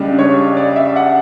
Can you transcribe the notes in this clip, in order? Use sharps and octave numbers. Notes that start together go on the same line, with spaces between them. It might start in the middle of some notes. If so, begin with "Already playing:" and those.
Already playing: C#2 C#3 G3 D4
C#5
D5
E5
F#5